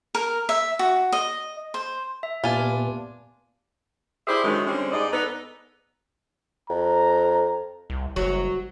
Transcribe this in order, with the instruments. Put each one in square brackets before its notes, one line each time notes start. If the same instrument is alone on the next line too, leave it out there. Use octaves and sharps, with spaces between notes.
[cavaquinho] A#4
E5
F#4
D#5
C5
[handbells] E5
[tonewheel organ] A#2 B3 [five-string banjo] D4 F4 [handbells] G4 G#5
[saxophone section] E4 G4 G#4 C5 D5 E5
D3 D#3 F#3 G#3
D3 G3 G#3 C4 C#4
G#2 D5 D#5
B3 D#4 A4 B4
[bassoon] F2 [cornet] A#5
[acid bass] C2
[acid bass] F#1 [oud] F#3